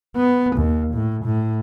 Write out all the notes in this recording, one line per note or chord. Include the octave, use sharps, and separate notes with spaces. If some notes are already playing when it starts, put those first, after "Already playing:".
B3
D#2
A2
A2